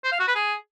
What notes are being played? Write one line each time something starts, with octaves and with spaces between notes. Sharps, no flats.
C5
F5
F#4
B4
G#4